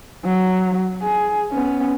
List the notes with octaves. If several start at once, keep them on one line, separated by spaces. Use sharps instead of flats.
F#3
G#4
B3 C#4